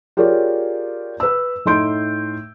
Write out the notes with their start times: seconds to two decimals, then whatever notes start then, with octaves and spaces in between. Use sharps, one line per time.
0.17 F4 G4 G#4 A#4 C#5 D5
1.20 B4 E6
1.65 A2 A3 D#4 C6 G6 D7